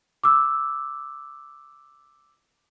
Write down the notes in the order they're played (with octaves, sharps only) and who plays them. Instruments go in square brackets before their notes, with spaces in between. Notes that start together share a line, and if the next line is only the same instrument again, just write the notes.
[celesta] D6 E6